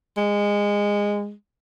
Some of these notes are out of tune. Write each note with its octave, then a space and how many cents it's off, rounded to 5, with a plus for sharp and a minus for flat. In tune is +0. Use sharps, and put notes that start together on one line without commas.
G#3 -20